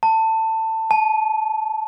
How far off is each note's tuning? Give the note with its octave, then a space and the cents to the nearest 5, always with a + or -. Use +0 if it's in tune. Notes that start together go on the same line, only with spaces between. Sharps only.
A5 +20
A5 -30